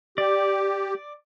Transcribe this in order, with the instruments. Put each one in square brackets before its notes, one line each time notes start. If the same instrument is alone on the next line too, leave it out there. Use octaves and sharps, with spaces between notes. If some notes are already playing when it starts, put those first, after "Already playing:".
[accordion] G4 [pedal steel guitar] D5